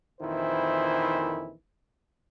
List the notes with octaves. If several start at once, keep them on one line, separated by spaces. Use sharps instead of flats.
A#1 F2 D#3 E3 E4 C5